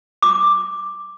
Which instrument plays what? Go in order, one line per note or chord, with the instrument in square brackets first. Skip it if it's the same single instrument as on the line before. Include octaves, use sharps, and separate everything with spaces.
[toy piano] D6